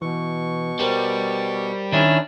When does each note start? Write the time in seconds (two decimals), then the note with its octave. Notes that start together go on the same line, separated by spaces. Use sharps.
0.02 B2 E3 C#6
0.79 G3 G4 A#4 C5
1.92 D#3 C#4 D4 E4